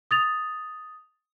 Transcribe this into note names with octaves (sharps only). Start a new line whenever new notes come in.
D#6 A6 F7